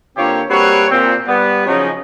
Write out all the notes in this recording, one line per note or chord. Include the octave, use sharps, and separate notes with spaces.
D3 A#3 C4 F4 G4 C#5
G3 A#3 C4 F#4 B4 C#5
A#2 C4
G3 B3
C#3 F3 F#3 C#4 D#4